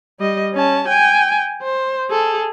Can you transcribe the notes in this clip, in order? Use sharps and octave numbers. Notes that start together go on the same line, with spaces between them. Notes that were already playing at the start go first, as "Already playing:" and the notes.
G3 D#5
C#4 A5
G5 G#5
C5
G#4 A4